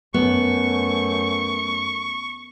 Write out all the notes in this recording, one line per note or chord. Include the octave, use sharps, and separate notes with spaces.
F#2 A3 B3 C#6